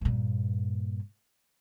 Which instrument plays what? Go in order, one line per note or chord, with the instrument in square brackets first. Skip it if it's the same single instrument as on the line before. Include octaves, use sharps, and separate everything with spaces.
[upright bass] G2 A#2